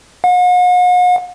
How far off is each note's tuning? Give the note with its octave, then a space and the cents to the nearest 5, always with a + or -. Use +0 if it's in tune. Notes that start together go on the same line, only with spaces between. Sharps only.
F#5 -45